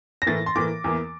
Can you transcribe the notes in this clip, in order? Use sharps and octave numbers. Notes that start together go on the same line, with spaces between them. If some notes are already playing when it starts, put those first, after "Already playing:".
A#6
A2 E3 A#3 A6
C6
A2 E3 A#3 D6
E2 E3 A#3